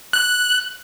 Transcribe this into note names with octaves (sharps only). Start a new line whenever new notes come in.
F#6